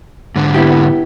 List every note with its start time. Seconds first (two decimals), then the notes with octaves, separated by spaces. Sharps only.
0.36 G#2 D3
0.54 B3 E4 G4